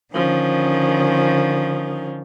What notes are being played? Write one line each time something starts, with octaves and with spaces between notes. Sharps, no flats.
D3 D#3 F3 C#4